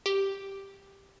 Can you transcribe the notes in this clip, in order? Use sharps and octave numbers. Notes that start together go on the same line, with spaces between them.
G4